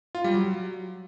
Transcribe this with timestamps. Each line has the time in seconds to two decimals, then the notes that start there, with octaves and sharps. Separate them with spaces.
0.15 F4
0.24 G3
0.34 F#3